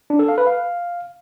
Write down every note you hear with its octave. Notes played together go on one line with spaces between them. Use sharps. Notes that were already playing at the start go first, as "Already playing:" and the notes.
D4
A4
F5
B4
F5